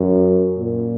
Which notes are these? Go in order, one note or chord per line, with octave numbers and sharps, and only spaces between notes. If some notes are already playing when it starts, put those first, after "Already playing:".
Already playing: F#2
A#2